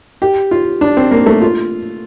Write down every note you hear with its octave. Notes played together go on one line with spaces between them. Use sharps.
G4
F4
D4
C4
A#3
A3
F4